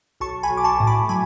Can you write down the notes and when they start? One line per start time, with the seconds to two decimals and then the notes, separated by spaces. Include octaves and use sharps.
0.20 B1 A5 C#6
0.43 G#5 B5
0.50 B1
0.57 D6
0.64 A5 C#6
0.80 A2
0.87 B5 D6
1.09 F#3 G#5 B5